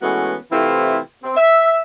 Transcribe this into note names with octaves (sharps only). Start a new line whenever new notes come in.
E3 G#3 A3 B3 C#4 F#4
C3 E3 A3 C4 E4 F4
C4
E5